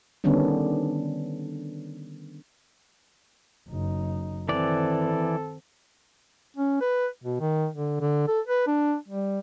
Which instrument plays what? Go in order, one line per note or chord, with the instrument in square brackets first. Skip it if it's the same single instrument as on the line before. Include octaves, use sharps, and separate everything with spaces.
[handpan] D3 D#3 G3 B3 C#4 D4
[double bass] F#1 D#4
[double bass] D#3 C4 [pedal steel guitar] E3 D5 [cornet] A4
[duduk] C#4
B4
B2
D#3
D3
D3
A4
B4
D4
G3